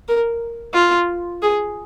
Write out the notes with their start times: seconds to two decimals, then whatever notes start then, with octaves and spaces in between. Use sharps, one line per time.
0.08 A#4
0.74 F4
1.43 G#4